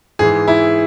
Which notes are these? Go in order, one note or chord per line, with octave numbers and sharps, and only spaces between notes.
G#2 E3 G#4
E4